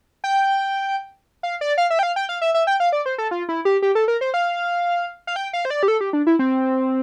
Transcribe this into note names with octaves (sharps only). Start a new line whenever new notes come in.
G5
F5
D5
F5
E5
G5
F5
G5
F5
E5
E5
G5
F5
D5
C5
A4
F4
E4
G4
G4
A4
A#4
C5
F5
F5
G5
F5
C5
D5
G4
A4
G4
D4
E4
C4